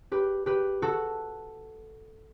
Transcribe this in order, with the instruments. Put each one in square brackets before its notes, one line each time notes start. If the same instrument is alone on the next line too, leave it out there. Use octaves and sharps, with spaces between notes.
[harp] G4 B4
G4 B4
F#4 A4